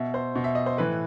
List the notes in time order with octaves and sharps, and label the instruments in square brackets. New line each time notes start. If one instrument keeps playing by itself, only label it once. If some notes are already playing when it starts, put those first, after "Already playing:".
Already playing: [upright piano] B2 E5
C5
B2
E5
D#5
C5
A2 E3 B4